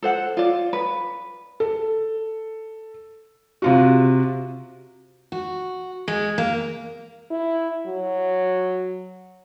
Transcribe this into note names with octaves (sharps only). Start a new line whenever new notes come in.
A4 C5 F#5
F4 D5
B4
A4
C3 F4 F#4
F#4
G#3
A#3
E4
F#3